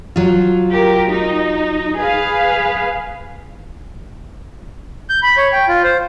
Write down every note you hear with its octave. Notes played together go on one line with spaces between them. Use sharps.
F#3 F4
G4 A#4
D#4
G#4 B4 F5
G6
B5
C#5
G5
F4
C5